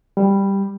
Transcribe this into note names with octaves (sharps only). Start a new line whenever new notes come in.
G3